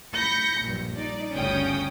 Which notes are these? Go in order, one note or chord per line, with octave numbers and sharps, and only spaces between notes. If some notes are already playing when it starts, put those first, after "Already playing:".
B5 G6 A#6 C#7
A#1 G2
D#4 D5
G1 D2 C#3 C#4 G5 D#6